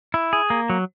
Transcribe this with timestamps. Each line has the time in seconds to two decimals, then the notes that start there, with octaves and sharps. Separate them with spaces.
0.14 E4
0.33 G#4
0.50 A#3
0.70 F#3